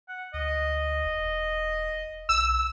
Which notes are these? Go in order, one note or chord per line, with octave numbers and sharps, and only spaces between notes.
F#5
D2 D#5
E1
B1 E6